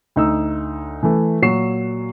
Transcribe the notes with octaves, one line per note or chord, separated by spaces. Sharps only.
D2 D#4 E6
E3 A3
A#2 F#3 C#6 C7 E7